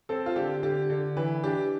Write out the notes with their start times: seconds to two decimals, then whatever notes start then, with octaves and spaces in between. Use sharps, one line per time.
0.09 C4 A4
0.26 F4
0.36 D3 G4
0.63 D3 G4
0.90 D3
1.17 E3 B4
1.43 D4 G4